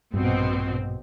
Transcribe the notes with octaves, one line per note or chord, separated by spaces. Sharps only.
A#1 G2 B2 C4